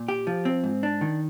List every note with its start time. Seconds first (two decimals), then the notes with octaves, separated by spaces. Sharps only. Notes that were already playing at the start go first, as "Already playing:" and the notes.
Already playing: A#2
0.08 G4
0.27 F3
0.45 C4
0.64 G#2
0.83 D4
1.01 D#3